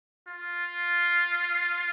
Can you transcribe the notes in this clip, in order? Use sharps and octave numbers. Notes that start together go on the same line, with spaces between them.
F4